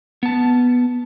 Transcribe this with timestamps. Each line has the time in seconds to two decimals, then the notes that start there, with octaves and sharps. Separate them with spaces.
0.23 B3 A5